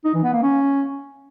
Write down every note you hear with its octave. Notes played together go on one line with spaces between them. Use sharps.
D#4
E3
B3
A#3
C#4